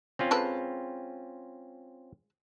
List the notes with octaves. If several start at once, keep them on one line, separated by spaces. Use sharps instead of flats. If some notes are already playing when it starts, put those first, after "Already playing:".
C4 C#4 F4
G#3 A4 B4